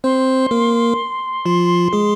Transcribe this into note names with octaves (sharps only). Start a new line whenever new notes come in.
C4 C5 C6
A#3 A#4
F3 F4
G#3 G#4